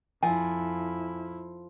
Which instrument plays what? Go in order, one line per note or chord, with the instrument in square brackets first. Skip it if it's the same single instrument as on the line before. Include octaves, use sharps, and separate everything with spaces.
[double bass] F2 E4 [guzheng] F3 [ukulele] G#5